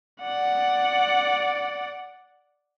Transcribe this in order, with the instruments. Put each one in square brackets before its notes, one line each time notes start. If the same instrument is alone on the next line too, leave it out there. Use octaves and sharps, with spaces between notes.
[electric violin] D5 F#5